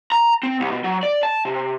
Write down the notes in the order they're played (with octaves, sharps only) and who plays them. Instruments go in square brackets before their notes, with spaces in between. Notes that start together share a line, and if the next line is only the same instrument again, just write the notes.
[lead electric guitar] A#5
C4
C2
B2
F#3
D5
A5
C3